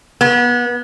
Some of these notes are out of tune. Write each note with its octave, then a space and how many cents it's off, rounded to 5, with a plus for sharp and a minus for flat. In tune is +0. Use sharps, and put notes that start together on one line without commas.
B3 -30